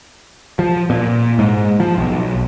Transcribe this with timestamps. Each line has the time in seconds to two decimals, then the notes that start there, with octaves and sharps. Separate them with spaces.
0.59 F3
0.90 A#2
1.39 G#2
1.80 F3
1.98 B1